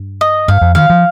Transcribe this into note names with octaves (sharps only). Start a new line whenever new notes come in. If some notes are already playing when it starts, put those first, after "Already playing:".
Already playing: G2
D#5
G2 F5
F2
D#3 F5
F3